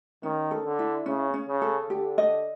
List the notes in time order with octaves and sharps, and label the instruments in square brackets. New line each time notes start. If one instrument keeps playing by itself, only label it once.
[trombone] D#3 [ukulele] C#4
[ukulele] A4
[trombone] D3
[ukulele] E4
[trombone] C#3 [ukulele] C#4
[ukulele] C#4
[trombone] C#3
[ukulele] A4
[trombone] D3 [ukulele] G4
[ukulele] D#5